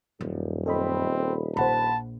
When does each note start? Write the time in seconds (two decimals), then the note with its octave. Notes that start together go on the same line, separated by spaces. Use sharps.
0.21 D#1 F#2
0.66 C4 A4 D#5 B5
1.57 A#1 C5 F#5 A5 B5